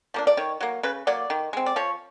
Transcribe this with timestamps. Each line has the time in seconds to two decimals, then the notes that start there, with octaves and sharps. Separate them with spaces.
0.14 F3 A#3 D4
0.27 D5
0.37 D#3 C#5
0.60 F#3 A#3
0.83 C#3 B4
1.07 F#3 A#3 D5
1.30 D#3
1.53 G#3 C4
1.66 D5
1.76 F3 C#5